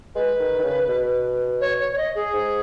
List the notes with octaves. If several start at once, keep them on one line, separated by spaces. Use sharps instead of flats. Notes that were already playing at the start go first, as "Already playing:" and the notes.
G#3 B4
D#3
D#3
C#3
B2
C#5
C#5
C#5
D#5
G#4
G#2